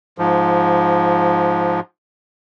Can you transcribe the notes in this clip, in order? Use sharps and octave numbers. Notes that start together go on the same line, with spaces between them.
G#2 F3